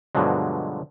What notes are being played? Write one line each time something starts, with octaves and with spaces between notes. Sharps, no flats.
G2 B2 D3 F3 F#3 G#3